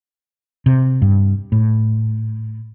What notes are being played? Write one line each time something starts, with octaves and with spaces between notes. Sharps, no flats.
C3
G2
A2